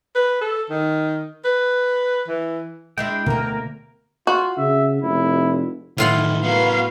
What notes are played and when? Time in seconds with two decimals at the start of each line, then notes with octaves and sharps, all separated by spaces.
0.16 B4
0.41 A4
0.70 D#3
1.45 B4
2.28 E3
2.98 G#3 D4 E4 G5
3.26 D2 B2 D3 A3 A#3 A#4
4.27 F4 F#4
4.58 C#3 E5
5.03 F1 E4
5.98 A2 D#3 E3 F4 F#5
6.44 B3 F#4 A#4 B4 F5